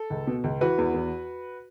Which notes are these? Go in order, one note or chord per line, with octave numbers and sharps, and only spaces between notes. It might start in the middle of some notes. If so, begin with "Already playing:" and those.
Already playing: A4
C#2
B2
C#2
E3 F#4 B4
E2
E2